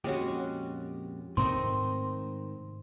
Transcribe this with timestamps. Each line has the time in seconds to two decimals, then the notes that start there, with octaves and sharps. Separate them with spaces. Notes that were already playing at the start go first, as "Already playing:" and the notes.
0.04 F2 A#2 G#3 C#4 F#4 G4
1.37 G#2 C3 D#3 A3 C4 D#4 C6